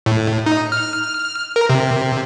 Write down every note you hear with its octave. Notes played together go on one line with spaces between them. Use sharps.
A2
D#4
F6
A#4
C3